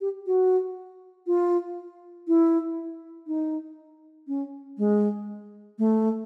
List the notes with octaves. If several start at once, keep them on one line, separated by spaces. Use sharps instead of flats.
G4
F#4
F4
E4
D#4
C#4
G#3
A3